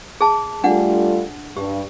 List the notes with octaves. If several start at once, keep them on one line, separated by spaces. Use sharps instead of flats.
G#4 A5
G3 A3 D4 F4 F#5
G2 G4